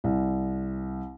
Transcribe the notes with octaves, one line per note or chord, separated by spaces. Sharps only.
C2